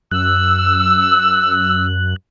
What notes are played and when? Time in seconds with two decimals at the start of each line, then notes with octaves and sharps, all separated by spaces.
0.11 F#2 E6 F#6